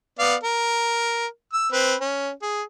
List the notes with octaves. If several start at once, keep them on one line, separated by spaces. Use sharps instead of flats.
B3 D5 F5
A#4
E6
C4 B4
C#4
G#4